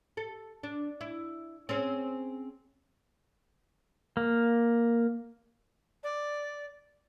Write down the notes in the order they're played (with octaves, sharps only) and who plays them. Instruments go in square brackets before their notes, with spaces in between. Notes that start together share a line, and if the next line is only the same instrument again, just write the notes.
[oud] A4
D4
E4
C4 C#4 G#4
[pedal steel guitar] A#3
[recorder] D5